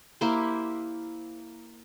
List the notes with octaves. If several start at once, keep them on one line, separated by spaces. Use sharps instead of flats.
A#3 E4 G4 C5